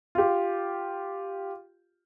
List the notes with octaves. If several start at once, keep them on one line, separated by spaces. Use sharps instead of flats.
F4 G4